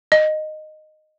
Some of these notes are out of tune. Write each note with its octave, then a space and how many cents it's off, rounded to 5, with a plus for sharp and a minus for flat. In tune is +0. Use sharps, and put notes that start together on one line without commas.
D#5 -10